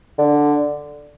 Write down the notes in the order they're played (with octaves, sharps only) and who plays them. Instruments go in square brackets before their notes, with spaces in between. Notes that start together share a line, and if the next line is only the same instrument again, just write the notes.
[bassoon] D3